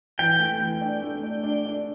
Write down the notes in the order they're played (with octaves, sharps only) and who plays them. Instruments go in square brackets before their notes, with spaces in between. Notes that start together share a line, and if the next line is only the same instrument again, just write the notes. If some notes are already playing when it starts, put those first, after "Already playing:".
[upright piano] E3 [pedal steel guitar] G5
[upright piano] A3
E3
D4
A3
D4
D4
D4